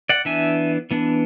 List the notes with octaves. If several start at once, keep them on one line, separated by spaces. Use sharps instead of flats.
D5 F#5
E3 B3 D4 E5 G#5
E3 B3 D4